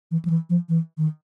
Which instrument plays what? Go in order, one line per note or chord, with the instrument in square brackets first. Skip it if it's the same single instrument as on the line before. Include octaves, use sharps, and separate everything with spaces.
[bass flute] E3
F3
E3
F3
E3
D#3